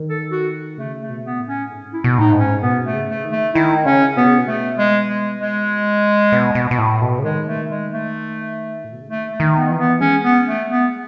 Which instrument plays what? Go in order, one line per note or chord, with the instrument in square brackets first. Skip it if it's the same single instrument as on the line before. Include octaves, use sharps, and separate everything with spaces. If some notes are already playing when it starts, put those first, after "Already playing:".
Already playing: [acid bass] D#3
[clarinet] A4
F#4
[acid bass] C#3 [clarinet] A3
[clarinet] A3
[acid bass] B2
[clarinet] B3
[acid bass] A2
[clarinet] C#4
[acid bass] G#2
[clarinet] E4
[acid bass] B2
[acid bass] A2 [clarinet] D#4
[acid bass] G#2
[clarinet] C#4
[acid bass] B2 [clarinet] B3
[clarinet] A3
[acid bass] C#3
[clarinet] A3
[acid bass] D#3
[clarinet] A3
[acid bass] D#3 [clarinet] E4
[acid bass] C#3 [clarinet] C#4
[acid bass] B2 [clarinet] B3
[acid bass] C#3
B2
[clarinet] A3
G#3
G#3
G#3
[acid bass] B2
B2
B2
A2
B2
C#3
[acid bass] D#3 [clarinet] G#3
[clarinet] A3
G#3
A3
[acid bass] A2
B2
C#3
[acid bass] D#3 [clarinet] A3
[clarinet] A3
[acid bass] D#3
[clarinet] B3
[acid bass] E3
[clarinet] B3
[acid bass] G#3 [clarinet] C#4
[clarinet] B3
A3
B3